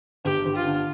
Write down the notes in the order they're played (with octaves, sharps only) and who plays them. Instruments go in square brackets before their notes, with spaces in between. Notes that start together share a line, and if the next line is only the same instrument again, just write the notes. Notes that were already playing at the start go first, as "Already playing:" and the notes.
[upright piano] G1 [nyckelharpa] G4
[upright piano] G1
[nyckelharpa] F4
[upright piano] D3